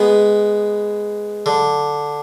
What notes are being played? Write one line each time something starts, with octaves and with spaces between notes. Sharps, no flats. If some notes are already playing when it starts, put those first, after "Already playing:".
Already playing: G#3 B3
D3